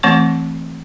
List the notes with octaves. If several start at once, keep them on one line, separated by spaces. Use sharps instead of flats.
E3 A3 C4 C#6